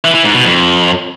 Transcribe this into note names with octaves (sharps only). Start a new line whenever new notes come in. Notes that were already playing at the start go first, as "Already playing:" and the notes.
E3
E3
G#2
B2
F2